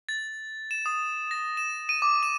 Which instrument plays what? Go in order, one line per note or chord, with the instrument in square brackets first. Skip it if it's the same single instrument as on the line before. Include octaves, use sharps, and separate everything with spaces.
[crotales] A6
E7
D#6
A#6
E7
D#7
D6
E7